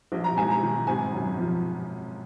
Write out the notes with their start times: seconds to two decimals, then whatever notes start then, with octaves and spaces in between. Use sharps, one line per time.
0.12 A#1
0.24 A#5
0.37 G#2 G#5
0.51 A#5
0.62 D#3
0.87 G#1 G#5
1.12 F#2
1.38 F3